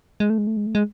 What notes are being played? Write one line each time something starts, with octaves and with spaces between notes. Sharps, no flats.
G#3
A3
G#3
A3
G#3
A3
G#3